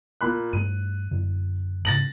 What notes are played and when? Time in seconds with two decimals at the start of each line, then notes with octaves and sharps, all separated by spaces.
0.21 A#2 B5 F#6
0.53 G2 G3 A3 D#7
1.11 F#2 D3
1.85 G#2 C#3 A6 A#6 F#7